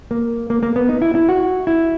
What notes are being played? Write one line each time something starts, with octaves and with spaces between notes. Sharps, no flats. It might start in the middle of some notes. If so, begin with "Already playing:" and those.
A#3
A#3
A#3
B3
D#4
E4
E4
F#4
E4